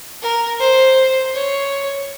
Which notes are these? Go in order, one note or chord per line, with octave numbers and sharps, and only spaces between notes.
A#4
C5
C#5